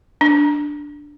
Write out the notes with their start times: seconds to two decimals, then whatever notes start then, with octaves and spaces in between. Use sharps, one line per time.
0.21 D4